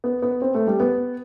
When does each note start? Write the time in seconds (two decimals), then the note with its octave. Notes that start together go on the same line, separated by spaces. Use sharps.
0.04 B3
0.22 B3
0.42 C4
0.55 A3
0.67 G3
0.80 B3